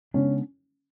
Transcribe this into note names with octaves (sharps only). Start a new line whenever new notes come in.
C#3 G#3 B3 C#4 D4